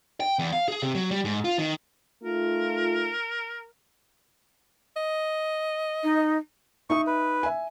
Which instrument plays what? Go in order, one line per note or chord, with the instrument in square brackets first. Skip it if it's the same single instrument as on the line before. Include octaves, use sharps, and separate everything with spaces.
[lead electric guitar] G5
E2
F5
G#4
C3
F#3
G3
G#2
F4
D#3
[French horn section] A3 D#4 F4 [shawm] A#4
[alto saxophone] D#5
[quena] D#4
[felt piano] D#4 E5 D#6 [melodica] C#6
[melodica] B4
[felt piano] E5 G#5